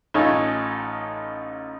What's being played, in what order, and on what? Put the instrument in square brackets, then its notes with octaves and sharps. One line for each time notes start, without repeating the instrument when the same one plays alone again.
[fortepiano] A1 A3 D#4 F4 C#5 G#5